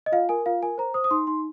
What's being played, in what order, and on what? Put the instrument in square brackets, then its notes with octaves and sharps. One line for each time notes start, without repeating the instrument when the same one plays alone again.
[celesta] D#5
F4 F5
A#4 G#5
F4 F5
A#4 G#5
C5 A#5
C5 D#6
D#6
D#4 C6
D#4 C6